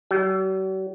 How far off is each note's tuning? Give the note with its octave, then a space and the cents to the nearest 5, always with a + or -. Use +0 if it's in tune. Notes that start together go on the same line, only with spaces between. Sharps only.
F#3 +45